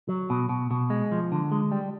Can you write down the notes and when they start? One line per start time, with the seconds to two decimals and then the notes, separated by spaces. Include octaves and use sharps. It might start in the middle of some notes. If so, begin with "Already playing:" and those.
0.09 F#3
0.30 B2
0.49 B2
0.71 B2
0.90 G#3
1.12 F3
1.32 D3
1.52 G#3
1.72 G3